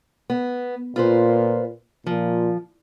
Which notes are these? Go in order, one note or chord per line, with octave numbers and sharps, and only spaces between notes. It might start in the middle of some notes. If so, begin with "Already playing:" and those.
B3
A#2 F4 B4 C5
A#2 F3